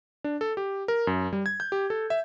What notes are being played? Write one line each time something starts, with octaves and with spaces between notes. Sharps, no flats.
D4
A4
G4
A#4
F#2
G3
G#6
G6
G4
A4
E5